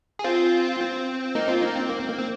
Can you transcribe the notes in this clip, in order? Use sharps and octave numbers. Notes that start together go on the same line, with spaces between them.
G#4
C4 F4
C4
A#3 D#4
C4 F4
A#3 D#4
C4
A#3
C4
A#3
C4